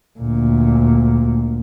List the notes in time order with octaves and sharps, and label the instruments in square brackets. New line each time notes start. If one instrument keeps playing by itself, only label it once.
[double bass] D2 A#2